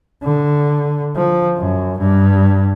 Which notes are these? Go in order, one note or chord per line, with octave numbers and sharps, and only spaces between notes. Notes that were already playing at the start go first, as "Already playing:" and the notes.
D3
F3
F#2
G2